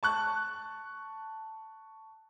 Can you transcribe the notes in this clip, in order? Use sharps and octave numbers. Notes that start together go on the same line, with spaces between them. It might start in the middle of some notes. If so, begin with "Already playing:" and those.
A5 C#6 F#6